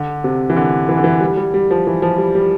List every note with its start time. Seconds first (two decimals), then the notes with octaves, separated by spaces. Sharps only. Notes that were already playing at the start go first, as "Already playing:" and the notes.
Already playing: D3
0.24 C3
0.50 E3
0.56 D3
0.89 E3
0.97 D3
1.04 E3
1.21 G3
1.37 G3
1.54 G3
1.71 F3
1.87 E3
2.02 F3
2.18 G3
2.35 G3